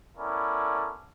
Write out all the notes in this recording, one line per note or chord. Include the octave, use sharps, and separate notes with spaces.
B3 C#4 E4 A4 A#4 D5